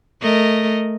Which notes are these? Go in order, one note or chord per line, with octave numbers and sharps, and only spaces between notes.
A3 A#4 D#5